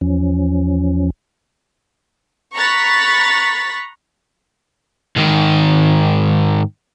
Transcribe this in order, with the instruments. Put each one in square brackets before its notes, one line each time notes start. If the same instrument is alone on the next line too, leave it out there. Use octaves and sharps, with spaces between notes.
[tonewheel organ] E2 F3 C#4
[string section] A#5 B5 C#6 F#6 A6 B6
[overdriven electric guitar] G#2 D#3